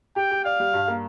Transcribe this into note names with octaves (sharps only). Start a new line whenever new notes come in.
G4 G5
G4
D5 F5
G3
G2
A#3